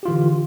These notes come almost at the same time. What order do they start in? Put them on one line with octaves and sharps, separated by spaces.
G4 F4 E3 D3